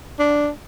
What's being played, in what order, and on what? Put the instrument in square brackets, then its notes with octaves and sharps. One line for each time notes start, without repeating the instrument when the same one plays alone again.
[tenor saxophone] D4